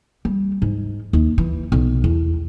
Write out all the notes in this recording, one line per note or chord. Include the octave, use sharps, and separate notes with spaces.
G3
G#2
D#2
E3
B1
E2